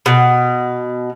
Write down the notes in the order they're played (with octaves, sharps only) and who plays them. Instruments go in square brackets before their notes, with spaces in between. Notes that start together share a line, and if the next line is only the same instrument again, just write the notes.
[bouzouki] B2